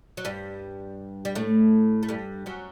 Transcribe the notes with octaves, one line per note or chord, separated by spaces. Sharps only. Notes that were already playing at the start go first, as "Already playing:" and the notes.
F#3
G2 G3
G3
A2 A3
A3
G2 G3
F#2 F#3